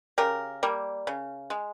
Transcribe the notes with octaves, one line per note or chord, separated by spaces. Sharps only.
C#3 G4 A#4
G3 A#3
C#3
G#3